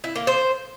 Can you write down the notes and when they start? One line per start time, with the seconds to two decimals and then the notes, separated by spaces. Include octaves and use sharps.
0.04 E4
0.15 A#3
0.27 C5